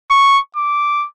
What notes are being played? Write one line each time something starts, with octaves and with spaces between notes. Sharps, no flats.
C#6
D6